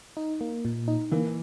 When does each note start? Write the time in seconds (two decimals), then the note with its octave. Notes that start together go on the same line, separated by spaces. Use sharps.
0.17 D#4
0.41 A#3
0.65 A#2
0.88 D#4
1.12 E3 A#3